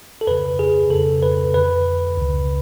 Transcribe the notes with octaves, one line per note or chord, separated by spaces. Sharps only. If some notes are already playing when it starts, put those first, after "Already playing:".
A4
F2 C#3 B4
G#4
F2 C#3 A4
B4
F2 D3 B4
C#2 C#3